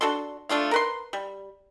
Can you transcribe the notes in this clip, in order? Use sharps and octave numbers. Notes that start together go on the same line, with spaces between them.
D4 F#4 A4 C6
A3 D4 F4 F5
A#4 B4 C6
G3